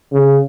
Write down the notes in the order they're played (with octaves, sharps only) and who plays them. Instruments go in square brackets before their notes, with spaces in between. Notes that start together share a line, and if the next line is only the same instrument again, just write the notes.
[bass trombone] C#3